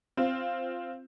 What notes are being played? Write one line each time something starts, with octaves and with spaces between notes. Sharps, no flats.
C4 F4